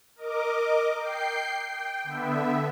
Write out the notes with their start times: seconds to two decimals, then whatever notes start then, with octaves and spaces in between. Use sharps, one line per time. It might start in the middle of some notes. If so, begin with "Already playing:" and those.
0.16 A#4 D#5 D6
0.98 G5 G6 C7
1.64 G5
2.04 D3 B3 E5